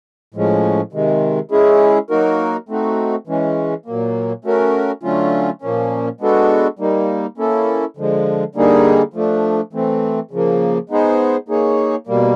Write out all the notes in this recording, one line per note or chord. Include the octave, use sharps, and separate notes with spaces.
A2 F3 G#3 C#4
C3 D#3 G#3
G#3 C#4 E4 G#4
F#3 A#3 D#4 F#4 A#4
A3 C4 D#4 F#4
E3 G#3 C#4
A#2 F#3 A#3
A3 C#4 F#4 A#4
D3 F#3 A3 C#4 F4
A#2 F3 A#3 C#4
G#3 B3 D4 F#4 A4
G3 A#3 D#4
A#3 C#4 E4 A4
D3 F3 G#3
D3 G3 A#3 D#4 G#4
F3 A3 D4
E3 A3 C4
C#3 F3 A#3
G#3 B3 D#4 G#4 C5
A#3 D#4 G#4 C#5
B2 G3 A#3